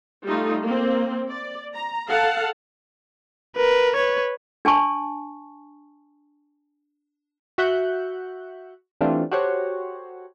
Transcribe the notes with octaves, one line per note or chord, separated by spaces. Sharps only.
G3 A3 D#4 F4
A#3 C4
D5
A#5
A4 F5 F#5 A5
A#4 B4
B4 C#5
D4 G#5 A5 C#6
F#4 E5 F#5 F#6 G6
E3 G3 A3 C4 D4 F4
F#4 G4 A4 C5 C#5 F#5